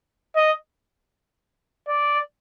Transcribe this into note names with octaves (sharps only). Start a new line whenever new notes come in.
D#5
D5